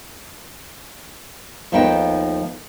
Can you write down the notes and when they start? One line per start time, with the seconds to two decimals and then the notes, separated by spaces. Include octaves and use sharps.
1.72 D#2 F3 A3 B3 D#4 G5